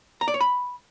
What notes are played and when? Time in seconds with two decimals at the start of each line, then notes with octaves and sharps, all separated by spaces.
0.21 A#5
0.28 D5
0.34 C#5
0.41 B5